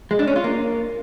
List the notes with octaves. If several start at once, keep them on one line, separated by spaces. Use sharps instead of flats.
G#3
D4
C#4
F4
A#3